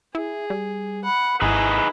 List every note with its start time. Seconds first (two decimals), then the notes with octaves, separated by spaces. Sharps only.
0.15 E4 G#4
0.50 G3
1.04 F#5 B5
1.42 G#1 D#4 E4 G#4 B4 G#5